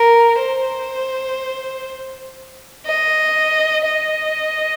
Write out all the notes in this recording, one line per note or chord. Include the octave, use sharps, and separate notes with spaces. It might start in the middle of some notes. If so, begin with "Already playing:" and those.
Already playing: A#4
C5
D#5
D#5